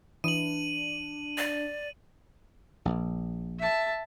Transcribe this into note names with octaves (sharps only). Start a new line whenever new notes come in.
E3 D4 D#7 F#7
D5
A#1
E5 A5